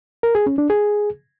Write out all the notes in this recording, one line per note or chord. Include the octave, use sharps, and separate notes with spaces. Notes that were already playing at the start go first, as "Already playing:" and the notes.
A#4
G#4
C#4
D4
G#4